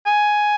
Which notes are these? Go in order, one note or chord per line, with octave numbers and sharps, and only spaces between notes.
G#5